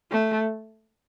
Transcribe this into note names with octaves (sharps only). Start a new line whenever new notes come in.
A3